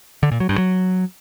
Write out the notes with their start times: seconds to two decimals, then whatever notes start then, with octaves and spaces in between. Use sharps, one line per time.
0.23 D3
0.32 A#2
0.40 F#3
0.49 G2
0.58 F#3